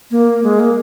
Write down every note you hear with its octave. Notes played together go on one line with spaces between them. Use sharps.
A#3
G#3
A#3